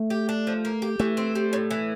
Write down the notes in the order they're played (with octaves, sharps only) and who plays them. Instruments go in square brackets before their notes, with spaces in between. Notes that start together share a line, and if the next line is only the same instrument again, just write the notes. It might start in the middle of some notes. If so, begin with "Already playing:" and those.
Already playing: [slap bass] A3
[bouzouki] G4
D4
F3
A#3
G4
[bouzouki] E3 [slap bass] A3
[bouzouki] C4
G3
A2
E3